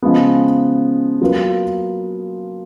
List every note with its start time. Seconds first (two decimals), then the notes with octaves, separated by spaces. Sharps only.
0.02 C#3 F3 G#3 B3
1.21 F#3 A#3 F4 B4